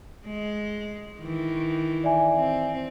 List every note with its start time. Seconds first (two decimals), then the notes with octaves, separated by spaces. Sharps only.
0.25 G#3
1.21 D#3 E3
2.04 D5 E5 G#5
2.34 C4